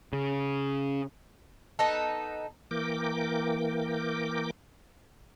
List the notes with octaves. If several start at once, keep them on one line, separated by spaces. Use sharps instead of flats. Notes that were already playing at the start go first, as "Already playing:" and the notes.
C#3
B3 D#4 A4
E3 A#3 A#4 G5 D6